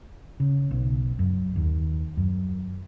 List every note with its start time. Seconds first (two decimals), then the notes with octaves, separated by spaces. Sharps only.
0.40 C#3
0.71 B1
1.19 F#2
1.56 D#2
2.17 F#2